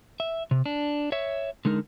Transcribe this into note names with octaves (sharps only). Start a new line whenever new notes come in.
E5
C3
D4
C#5 E5
D3 G#3 D#4 A#4